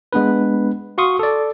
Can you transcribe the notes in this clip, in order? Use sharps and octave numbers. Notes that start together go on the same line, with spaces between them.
G#3 B3 D4 B4
F#4 F5 C6 C#6 D#6
A4 D5